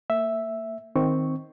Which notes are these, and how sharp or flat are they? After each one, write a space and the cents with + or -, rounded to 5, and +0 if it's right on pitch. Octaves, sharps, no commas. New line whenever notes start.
A#3 -35 E5 +0
D#3 +5 C4 +0 C#6 +0